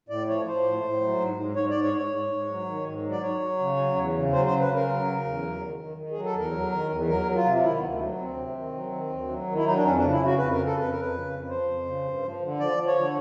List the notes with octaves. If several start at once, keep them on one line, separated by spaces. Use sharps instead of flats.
A2 D5
F3 C#5
F3 C5
A2
A2
F#3
G#2
G#2
G#2 C#5
G#2 D5
C#5
G#2 C#5
G#2
G#2
F#3
D#3
G#2
F#3
D5
F#3 C#5
F#3
C#3
F#3
E2
C#3
F#3 C5
C5
C#3
B4
C#3
A#4
F#3
C#3
E2
F#3
D#3
D#3
D#3
F#3 G#4
A4
E2 A#4
F#3
D#3
E2
F#3 A#4
F#3
F4
C3
F4
D#3 E4
D2 B3
A3
F#3
D2 C4
C3
D#3
F#3
D#3
D2
F#3
D#3
E4
F#3 D#4
D4
F2 C#4
D4
C#3
E4
C#3 F#4
F2 B4
A#4
C#3
A4
F2 B4
F2 A#4
B4
C#3
F2
F3 C5
F2
C#3
G2
F3
D3
F3 D5
F3
C#5
D3